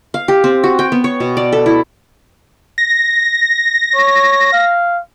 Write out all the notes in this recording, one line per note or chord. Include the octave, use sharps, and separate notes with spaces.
F5
G4
C4
F#4
G5
B3
C#5
B2
D5
A4
E4
A#6
C#5
F5